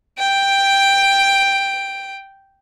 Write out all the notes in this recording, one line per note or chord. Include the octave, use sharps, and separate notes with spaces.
G5 D7